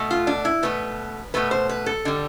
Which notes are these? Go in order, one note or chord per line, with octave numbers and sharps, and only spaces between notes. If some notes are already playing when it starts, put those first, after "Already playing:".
Already playing: B2 A3
F4
D4
E4
B2 A3 B4
B2 A3 B4
C5
B4
A4
D3 G3